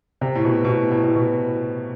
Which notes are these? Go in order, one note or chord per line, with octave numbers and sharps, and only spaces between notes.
C3
A2
B2
B2
A2
A2
A2
B2